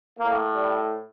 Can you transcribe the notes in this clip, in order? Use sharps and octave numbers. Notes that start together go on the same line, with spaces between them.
A2 A#3
G3